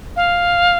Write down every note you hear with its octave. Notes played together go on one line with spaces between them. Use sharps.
F5